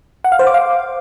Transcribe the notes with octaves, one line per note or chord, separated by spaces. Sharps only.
F#5
F5
C5
D6
F5